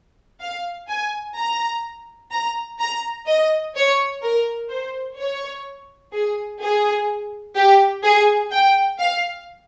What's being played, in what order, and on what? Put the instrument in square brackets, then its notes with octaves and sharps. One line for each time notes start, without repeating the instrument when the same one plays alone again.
[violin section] F5
G#5
A#5
A#5
A#5
D#5
C#5
A#4
C5
C#5
G#4
G#4
G4
G#4
G5
F5